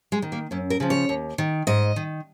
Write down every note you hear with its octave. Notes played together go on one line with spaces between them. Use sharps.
G#3
D#3
A#3
F#2 C#4
A#4
C#3 F3
C#5
D#2
D#3
G#2 D#5
D#3